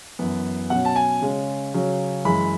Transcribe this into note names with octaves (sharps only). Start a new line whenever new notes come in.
F#2 E3 B3
B2 F#3 C#4 F#5
A5
G#5
C#3 G#3 C#4
C#3 F#3 C#4
F#2 E3 G#3 B5